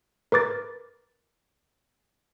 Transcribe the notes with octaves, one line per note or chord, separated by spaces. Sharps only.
A#4 B4 D6 A6